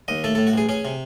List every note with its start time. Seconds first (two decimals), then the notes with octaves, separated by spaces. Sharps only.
0.08 D#2 D#5
0.24 A3 A4
0.35 A2 A4
0.47 F#4
0.53 A1 G#4
0.69 C#4 G#4
0.85 C3